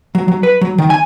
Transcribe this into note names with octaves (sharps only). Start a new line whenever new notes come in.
F#3
F#3
B4
F#3
D#3
G#5